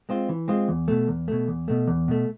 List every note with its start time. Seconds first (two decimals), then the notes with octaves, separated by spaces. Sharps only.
0.09 G#3 C4 F4
0.29 E3
0.48 G#3 C4 F4
0.68 E2
0.88 B2 A3
1.08 E2
1.28 B2 A3
1.48 E2
1.68 B2 A3
1.87 E2
2.08 B2 A3